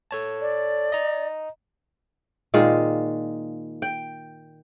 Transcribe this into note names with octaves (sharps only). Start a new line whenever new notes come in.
A4 C#5 A5
D5
D#5 A#5
A#2 D#3 G#3 F4
G5